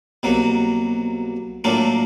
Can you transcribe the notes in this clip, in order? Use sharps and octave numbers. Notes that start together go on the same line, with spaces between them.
C2 B2 F#3 A#3
A2 F#3 A#3 D4 F4